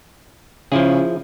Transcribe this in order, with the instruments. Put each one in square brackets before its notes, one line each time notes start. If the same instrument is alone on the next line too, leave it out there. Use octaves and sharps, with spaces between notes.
[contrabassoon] C#3 [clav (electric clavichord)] F3 E4 G#4